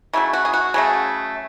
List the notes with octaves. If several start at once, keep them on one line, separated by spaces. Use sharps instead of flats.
C#3 F#3 A3 E4
F#4
G#4
F#4
C#3 F#3 A3 G#4